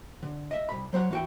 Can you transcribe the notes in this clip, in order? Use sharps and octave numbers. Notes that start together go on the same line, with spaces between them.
D3
D#5 E5
C2 B5
F#3 C5 C#5 F#5
E3 F#4 G5